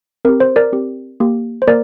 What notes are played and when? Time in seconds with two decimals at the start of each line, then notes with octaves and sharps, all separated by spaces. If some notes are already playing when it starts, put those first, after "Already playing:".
0.25 C4 G4 A#4
0.40 C5
0.56 A#4 D5
0.72 C4 G4
1.20 A#3 G4
1.62 C5
1.67 A#3 A#4 D5